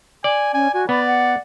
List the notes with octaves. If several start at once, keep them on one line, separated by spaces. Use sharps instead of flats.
D5 G#5
C#4 G#5
F#4 G#5
B3 D5 B5
F#5